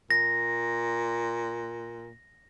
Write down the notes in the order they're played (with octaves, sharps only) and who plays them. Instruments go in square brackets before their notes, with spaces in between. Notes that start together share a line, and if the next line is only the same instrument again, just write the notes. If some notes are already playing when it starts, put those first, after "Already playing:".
[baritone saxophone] A#2 [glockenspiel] A#6